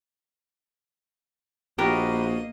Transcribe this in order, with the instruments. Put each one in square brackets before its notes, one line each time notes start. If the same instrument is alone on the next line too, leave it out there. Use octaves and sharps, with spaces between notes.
[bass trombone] A#1 [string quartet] A#3 D#5 [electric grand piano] B3 F#4 [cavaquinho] G4 A#4 B4